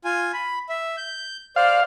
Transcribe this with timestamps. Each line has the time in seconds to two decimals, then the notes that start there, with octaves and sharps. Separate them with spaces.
0.05 F4 G#5
0.34 B5
0.69 E5
0.97 G6
1.56 C5 D5 F5